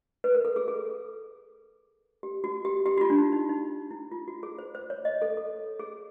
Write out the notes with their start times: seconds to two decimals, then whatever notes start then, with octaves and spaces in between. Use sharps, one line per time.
0.24 B4
0.35 A#4
0.45 A4
0.56 G#4
0.68 G#4
0.76 A4
2.23 G4
2.44 F#4
2.65 G4
2.86 G4
2.98 F#4
3.01 F4
3.10 D4
3.18 D#4
3.33 D#4
3.49 D#4
3.91 E4
4.12 F4
4.28 F#4
4.43 G#4
4.58 C5
4.75 C5
4.90 C#5
5.05 D#5
5.22 A4
5.37 A4
5.79 G#4